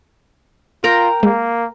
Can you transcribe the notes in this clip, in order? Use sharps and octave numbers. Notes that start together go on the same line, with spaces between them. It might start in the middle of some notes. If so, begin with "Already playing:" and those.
F4 A#4 G5 A#5
G#3 A#3